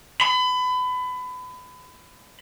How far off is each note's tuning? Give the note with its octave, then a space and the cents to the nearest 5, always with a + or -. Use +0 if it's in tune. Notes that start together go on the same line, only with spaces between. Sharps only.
B5 +30